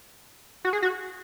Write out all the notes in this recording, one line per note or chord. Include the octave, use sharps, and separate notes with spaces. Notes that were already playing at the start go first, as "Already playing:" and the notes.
F#4
G#4
F#4